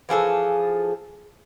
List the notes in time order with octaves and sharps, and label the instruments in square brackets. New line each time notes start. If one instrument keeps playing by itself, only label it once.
[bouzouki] E3 F3 G#4 A4